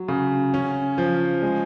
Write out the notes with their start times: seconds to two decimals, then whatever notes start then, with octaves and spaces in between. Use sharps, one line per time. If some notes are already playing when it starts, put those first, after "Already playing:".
Already playing: F#3
0.09 C#3
0.54 C#4
0.98 F3
1.42 G#3